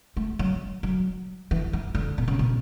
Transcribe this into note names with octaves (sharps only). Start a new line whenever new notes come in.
A3
F#3
F#3
E3
E3
D3
B2
C#3
B2